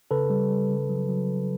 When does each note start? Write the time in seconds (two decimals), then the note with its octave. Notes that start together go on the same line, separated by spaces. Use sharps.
0.11 C#3 A4 B4
0.30 G3
0.50 G3
0.69 C#3
0.89 F#3
1.09 F#3